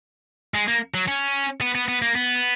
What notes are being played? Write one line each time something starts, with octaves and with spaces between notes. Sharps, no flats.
G#3
A#3
F#3
C#4
B3
B3
B3
A#3
B3